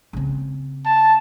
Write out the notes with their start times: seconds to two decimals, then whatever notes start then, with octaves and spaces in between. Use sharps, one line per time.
0.13 C#3 C4
0.86 A5